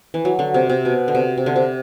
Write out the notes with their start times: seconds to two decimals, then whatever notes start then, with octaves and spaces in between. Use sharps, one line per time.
0.14 E3
0.25 F#3
0.39 D3
0.54 C3
0.69 C3
0.85 B2
1.08 D3
1.15 C3
1.38 C3
1.46 D3
1.56 C3